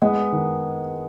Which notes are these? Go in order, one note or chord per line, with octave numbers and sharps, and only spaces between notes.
G#3 B3
D#3